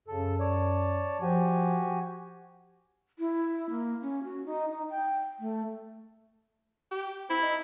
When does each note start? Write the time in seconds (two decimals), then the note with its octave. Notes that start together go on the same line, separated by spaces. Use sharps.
0.08 F#2 C#3 A4
0.40 C#5 D5 A5
1.21 F3 F#4 G4 G#5
3.19 E4
3.70 A#3
4.02 C#4
4.24 F#4
4.46 D#4
4.71 D#4
4.90 G5
5.39 A3
6.91 G4
7.30 C4 E4
7.42 D#4